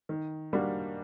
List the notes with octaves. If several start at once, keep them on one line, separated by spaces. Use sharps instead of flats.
D#3
G3 A#3 D4 F#4